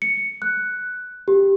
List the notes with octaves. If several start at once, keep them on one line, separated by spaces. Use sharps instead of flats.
C#7
F#6
G4